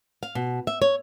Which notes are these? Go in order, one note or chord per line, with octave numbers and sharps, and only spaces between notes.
F5
B2
E5
C#5